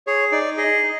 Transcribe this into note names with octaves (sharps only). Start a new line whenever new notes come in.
G#4 C#5
D#4 D5
G#4 D#5
D#4